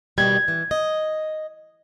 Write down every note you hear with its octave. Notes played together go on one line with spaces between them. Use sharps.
B2 D#3 G3 G#6
E3
D#5